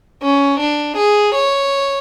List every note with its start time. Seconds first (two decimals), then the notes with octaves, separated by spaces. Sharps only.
0.23 C#4
0.60 D4
0.97 G#4
1.35 C#5